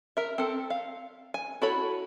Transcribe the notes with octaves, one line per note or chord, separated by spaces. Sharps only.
A#4 E5
C4 A4
F5
G#5
E4 F#4 A4 C#5 B5